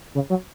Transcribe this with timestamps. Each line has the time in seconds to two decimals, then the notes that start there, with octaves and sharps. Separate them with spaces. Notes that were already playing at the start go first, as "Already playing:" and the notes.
0.15 C#3
0.30 F#3